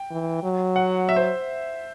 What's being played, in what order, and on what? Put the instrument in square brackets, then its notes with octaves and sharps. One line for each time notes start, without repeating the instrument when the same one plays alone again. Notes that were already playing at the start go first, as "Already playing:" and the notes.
Already playing: [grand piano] G5
[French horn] E3
F#3
[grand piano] F#5
E5
C5